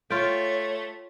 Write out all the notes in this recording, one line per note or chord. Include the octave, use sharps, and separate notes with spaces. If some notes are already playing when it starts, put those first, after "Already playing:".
A3 F4 C#5 G5